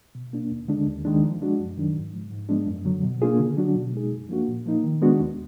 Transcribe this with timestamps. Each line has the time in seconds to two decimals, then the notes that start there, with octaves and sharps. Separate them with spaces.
0.15 B2
0.33 A#3 D4
0.51 D#2
0.68 D3 G#3 D4
0.87 D#2
1.05 D#3 G#3 D4
1.23 F3
1.41 G#3 D4 F#4
1.59 F#2
1.78 D#3 F#3 D4
1.96 G#2
2.13 F3 G#3
2.31 G#2
2.49 F3 G#3 B3 D4
2.67 F#2
2.85 D3 F#3
3.03 B2
3.22 A#3 D4 F4 G#4
3.39 D3
3.58 F#3 D4 F#4
3.76 B2
3.93 G#3 D#4 G#4
4.12 F#2
4.29 F3 A#3 D4 F#4
4.48 A#2
4.66 F3 A#3 D#4
4.84 D#3
5.02 G#3 B3 D4 F#4
5.20 D#2